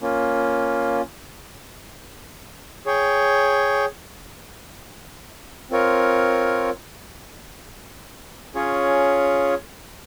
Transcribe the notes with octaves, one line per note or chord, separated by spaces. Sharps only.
A#3 C#4 F4
G#4 C#5 G5
C4 F4 A#4 C#5
C#4 F4 G#4 C#5